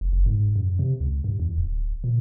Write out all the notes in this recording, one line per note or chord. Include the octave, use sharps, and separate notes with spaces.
F1
F#1
G#2
F#2
C3
C#2
G2
E2
D1
A#2